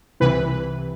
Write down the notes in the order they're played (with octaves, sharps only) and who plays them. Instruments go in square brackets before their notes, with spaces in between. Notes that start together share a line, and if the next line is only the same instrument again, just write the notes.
[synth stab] C2 C3 E3 B4